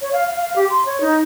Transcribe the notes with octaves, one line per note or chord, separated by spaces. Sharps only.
C#5
F5
F5
F5
G4
C6
C#5
D#4